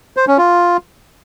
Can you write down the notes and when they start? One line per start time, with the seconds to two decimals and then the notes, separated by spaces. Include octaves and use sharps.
0.17 C5
0.27 C#4
0.38 F4